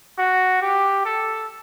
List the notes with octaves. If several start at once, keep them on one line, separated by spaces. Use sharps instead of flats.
F#4
G4
A4